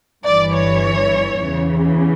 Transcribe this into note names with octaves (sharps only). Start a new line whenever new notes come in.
G1 G2 E3 D5
C#5
E2 C#3 E3